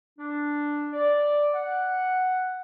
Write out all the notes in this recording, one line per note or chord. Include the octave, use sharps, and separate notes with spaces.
D4
D5
F#5